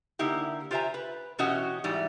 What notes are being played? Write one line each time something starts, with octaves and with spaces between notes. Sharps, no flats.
D3 A#3 D#4 E4 G4
F4 G4 C5 E5 G#5 A#5
B4
B2 E3 C#4 F#4 G4 D#5
G#2 E3 G3